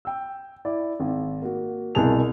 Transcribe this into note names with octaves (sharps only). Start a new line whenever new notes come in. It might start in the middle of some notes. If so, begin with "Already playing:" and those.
G5 E6
E4 D5
G#1
A#3 F#4
C2 B2 G#4 A#4 A5 F7